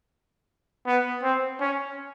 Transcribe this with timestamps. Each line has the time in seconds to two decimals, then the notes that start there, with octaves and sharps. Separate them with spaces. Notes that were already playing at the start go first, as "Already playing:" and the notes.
0.86 B3
1.22 C4
1.60 C#4